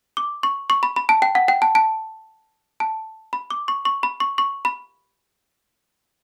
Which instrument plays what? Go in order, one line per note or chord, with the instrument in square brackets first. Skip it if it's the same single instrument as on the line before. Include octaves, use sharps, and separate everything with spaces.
[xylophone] D6
C#6
C#6
B5
B5
A5
G5
F#5
G5
A5
A5
A5
B5
D6
C#6
C#6
B5
C#6
C#6
B5